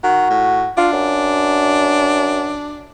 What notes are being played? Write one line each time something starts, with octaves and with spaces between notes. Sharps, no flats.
D#3 F#4
A2
D4 F4
F#2